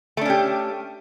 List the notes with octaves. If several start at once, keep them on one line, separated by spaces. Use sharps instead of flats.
A3 C#4 D4 G4